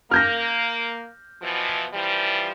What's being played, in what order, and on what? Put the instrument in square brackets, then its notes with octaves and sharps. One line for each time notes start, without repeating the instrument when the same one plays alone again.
[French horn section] A#3 [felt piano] F6 G6 A#6
[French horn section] B2 E3 F3
E3 F3 G3